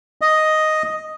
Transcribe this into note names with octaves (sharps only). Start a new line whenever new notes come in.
D#5